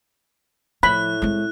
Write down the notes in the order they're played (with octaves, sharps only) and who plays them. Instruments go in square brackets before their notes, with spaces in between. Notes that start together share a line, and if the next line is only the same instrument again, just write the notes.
[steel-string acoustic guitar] A2 [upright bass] F3 [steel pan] B5 [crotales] F#6
[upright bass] G#3 C4